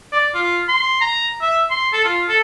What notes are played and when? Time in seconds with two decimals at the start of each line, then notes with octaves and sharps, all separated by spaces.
0.12 D5
0.34 F4
0.68 C6
1.01 A#5
1.41 E5
1.70 C6
1.93 A4
2.04 F4
2.28 A4